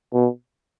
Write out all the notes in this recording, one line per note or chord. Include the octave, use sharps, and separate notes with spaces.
B2